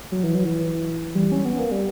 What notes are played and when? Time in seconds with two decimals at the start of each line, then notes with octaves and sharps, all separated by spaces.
0.12 F#3
0.23 E3
0.35 F#3
0.45 E3
1.15 G3
1.32 C#4
1.45 B3
1.58 A#3
1.71 G3